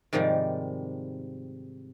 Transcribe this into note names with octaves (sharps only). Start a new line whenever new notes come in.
G#2 C3 D#3 F3 G3